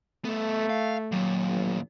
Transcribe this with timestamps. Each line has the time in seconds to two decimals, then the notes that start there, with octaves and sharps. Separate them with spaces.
0.25 A3 B3 A4
0.70 F5
1.12 D#2 A#2 F#3
1.49 A1